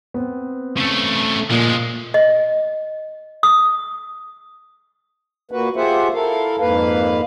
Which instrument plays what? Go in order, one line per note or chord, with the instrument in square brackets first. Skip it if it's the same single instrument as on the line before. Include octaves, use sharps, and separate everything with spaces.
[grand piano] B3 C4
[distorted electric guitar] C#3 A3
[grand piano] A#2 [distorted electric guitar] F3 G#3
[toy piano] D#5
D#6
[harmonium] A#2 A#3 F#4 B4
F4 G4 G#4 C5 E5 F#5
E4 A4 A#4 F5
F2 G#2 A#3 B4 F5